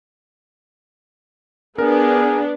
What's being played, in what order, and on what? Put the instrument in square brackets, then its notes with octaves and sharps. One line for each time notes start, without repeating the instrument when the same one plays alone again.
[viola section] B3 D4 [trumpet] G#4 [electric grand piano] A#4